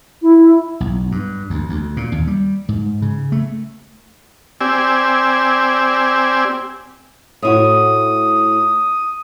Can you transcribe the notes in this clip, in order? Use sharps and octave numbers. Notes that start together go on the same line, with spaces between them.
E4
B1
G2
D2
D2
A#2
D#2
G3
G#2
C#3
A3
C4 G4 D5 G#5 E6
A2 E4 F#4 D#6